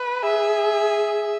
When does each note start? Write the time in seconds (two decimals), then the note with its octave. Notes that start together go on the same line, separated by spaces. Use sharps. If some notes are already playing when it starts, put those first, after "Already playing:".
Already playing: B4
0.23 G#4 E5